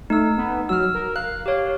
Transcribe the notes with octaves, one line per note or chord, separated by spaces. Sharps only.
A3 D#4 E6
B3
F#3 E6 F6
A#4
F5 F#6
G4 C#5